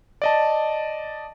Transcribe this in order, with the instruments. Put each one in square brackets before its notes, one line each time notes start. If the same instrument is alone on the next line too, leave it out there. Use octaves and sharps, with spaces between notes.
[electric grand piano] D5 D#5 A5